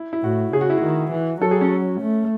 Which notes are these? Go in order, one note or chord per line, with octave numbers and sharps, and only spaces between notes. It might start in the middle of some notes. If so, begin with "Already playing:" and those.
Already playing: E4
E4
A2 F#4
C#3 G#4
F#4
E4
D#3 F#4
E3
F#3 A4
G#4
C#4
A3